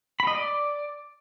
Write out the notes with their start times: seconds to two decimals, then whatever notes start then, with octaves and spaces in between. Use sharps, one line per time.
0.20 B5
0.27 D#5
0.35 D5